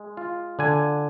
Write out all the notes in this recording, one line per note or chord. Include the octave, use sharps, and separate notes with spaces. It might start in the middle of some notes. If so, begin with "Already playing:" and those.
Already playing: G#3
F4
D3 G#5